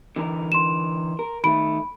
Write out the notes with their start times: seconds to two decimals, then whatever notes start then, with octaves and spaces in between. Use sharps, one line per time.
0.16 D3 E3 A#4
0.52 C6 E7
1.19 A#4
1.44 D#3 A3 B5 D7